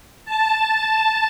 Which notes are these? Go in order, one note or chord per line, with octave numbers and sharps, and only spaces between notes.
A5